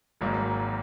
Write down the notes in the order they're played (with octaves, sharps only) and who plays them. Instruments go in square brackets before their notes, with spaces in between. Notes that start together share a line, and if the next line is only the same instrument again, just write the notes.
[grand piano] G#1 G#2 F#3 A#3